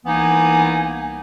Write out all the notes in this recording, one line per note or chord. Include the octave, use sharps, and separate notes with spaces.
C2 E3 A#3 B3 D#4 G#5